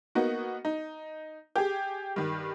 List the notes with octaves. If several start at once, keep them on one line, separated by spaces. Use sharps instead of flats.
A#3 B3 D#4 F#4
D#4
G4 G#4
G2 D#3